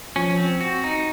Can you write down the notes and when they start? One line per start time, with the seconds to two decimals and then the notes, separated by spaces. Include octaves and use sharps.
0.16 F3 C#4
0.37 C4
0.61 F#4
0.84 D#4